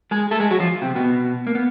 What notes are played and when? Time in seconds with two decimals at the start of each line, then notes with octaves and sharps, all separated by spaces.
0.11 G#3 G#4
0.31 A3 A4
0.40 G#3 G#4
0.50 F#3 F#4
0.60 F3 F4
0.82 C3 C4
0.95 B2 B3
1.47 A#3
1.55 B3